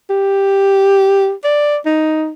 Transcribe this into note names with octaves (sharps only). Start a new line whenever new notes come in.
G4
D5
D#4